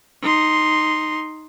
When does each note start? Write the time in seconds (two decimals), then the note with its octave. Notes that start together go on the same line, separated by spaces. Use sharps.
0.22 D#4 C6